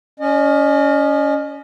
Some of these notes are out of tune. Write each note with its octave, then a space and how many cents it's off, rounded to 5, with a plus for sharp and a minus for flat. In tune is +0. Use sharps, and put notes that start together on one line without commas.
C#4 +25 D#5 -35